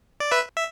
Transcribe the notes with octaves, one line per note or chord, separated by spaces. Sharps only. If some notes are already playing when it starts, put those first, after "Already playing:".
D5
B4 E5
E5